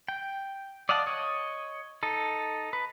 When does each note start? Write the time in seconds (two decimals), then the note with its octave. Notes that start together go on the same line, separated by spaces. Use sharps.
0.09 G5
0.89 D5 D#5 F5 F#5 A5
1.07 C#5 D#5
2.03 D#4 A4
2.73 B4